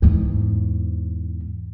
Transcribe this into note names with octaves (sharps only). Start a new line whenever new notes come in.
E2 G#2